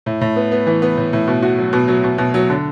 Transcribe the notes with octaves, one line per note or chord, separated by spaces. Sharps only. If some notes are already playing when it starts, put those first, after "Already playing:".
A2
A2
B3
B3
E3
B3
A2
A2
B2
F#4
F#3
B2
F#3
B2
B2
F#3
D3